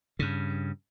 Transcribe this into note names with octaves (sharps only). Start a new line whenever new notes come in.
G2 C#3